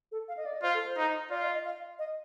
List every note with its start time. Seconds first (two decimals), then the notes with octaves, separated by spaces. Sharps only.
0.12 A4
0.28 F5
0.37 D#5
0.45 D5
0.54 D#5
0.63 F4 C5
0.74 A4
0.86 C5
0.97 D#4
1.30 F4 D5
1.42 D#5
1.54 D#5
1.65 F5
1.99 D#5